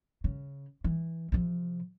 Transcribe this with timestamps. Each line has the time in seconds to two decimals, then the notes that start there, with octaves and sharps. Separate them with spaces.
0.24 C#3
0.84 E3
1.32 C3 F3